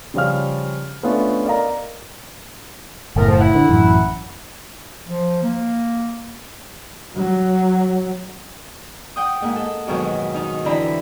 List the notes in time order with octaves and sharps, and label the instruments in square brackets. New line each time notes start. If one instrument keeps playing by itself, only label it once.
[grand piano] C#3 F3 G3 C#4 F5 F6
A3 B3 C#4 D4 F4
A#4 D5 D#5 F5 A#5
[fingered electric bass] F#1 A2 [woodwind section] A3 B3 A#4
[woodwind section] F3
E4 F#5
[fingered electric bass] D3
A1 F#2
[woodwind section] F3
A#3
[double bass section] F#3
[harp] F#5 G5 D#6
G#2 A#3
A4
F2 G#2 B2 D#3 F#3
D#3 D#4
F2 D3 E3 E4 A#5 B5